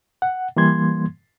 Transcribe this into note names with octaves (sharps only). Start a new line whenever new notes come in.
F#5
E3 G3 A#3 C6 G#6